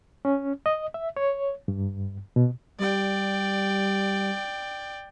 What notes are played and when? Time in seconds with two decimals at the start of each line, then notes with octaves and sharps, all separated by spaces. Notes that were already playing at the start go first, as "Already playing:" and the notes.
0.25 C#4
0.66 D#5
0.94 E5
1.17 C#5
1.68 G2
2.36 B2
2.79 G3 D5 G5